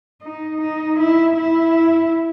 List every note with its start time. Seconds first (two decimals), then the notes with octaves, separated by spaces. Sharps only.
0.22 D#4
0.61 D#4
0.99 E4
1.37 E4